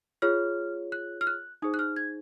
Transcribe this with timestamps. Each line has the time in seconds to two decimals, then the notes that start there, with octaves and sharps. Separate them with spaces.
0.22 F4 G#4 C#5 F6
0.92 F#6
1.21 F6
1.27 F#6
1.62 D#4 G#4 C5 D#6
1.74 F#6
1.79 F6
1.96 G#6